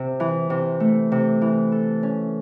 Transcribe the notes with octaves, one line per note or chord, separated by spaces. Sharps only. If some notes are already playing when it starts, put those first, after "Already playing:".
Already playing: C3
E3
C3
A3
C3
E3
A4
C#4